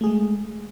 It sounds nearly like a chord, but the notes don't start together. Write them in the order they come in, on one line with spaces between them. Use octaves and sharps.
A3 G#4 G#3